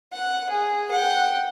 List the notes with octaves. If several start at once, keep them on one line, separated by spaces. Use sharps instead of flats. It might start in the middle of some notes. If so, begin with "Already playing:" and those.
F#5
G#4
F#5 G5